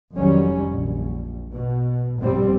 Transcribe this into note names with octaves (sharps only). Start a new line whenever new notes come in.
F1 F2 D#3 F#3 G3 C#4
A#1
B2
A#1 G2 B2 G3 C4